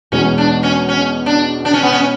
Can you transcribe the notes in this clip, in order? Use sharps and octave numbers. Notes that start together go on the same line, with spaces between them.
E2 B2 G#3 C#4
D4
C#4
C#4
D4
D4
C#4
B3
C#4